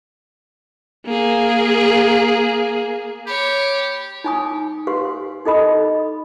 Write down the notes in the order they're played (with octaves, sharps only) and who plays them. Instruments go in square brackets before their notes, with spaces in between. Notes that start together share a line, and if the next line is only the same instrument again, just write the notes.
[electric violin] A#3 G#4
[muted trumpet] G4 [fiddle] C#5 [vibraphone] B5
[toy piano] D#4 G#5 D#6
G4 B4 F5 C6
D#4 A4 D#5 B5 D#6